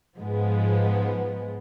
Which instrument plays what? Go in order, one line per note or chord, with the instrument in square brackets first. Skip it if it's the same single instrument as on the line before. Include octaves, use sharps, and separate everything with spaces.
[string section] G#2 F3 G#3 B3